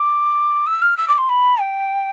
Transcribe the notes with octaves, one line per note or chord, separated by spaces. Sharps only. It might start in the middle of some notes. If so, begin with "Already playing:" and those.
Already playing: D6
E6
F6
E6
D6
C6
B5
G5